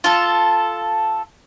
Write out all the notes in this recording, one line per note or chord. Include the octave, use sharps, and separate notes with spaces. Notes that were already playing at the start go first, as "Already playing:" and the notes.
F4 A4